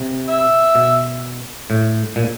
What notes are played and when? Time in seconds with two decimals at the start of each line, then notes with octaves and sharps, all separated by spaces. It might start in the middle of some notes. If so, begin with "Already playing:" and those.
Already playing: C3
0.28 E5
0.75 B2
1.70 A2
2.16 A#2